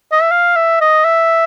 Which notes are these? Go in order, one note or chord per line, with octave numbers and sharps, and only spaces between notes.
D#5
E5
F5
E5
D#5
E5